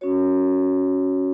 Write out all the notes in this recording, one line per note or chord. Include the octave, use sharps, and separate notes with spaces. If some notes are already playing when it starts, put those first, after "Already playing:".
C#4 F#4 C#5